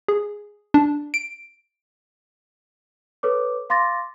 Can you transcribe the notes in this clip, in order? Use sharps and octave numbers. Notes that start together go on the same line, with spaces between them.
G#4
D4
D7
A4 B4 C#5 D6
F5 C6 D6 A6 A#6